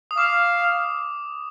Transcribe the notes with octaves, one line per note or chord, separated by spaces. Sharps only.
D#6
F5 D6